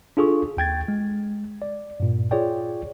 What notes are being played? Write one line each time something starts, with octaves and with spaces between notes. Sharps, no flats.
D4 F4 G#4 A4 C#6
D#2 G5 G#6 A6
G#3
D5
G2 A#2
F4 G#4 C#5 D5 G5